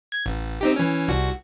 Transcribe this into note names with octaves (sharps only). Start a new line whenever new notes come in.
G#6
A1
C4 D#4 G4
E3 C#4
C2 F#4